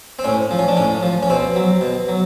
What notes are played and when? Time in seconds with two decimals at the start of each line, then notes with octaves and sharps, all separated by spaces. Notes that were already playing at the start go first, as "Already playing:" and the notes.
0.19 C4
0.24 A2 C#4
0.51 F3
0.59 C#4
0.68 D4
0.77 A2 C#4
1.03 F3
1.23 C#4
1.29 B2 C4
1.56 F#3
1.81 B2
2.08 F#3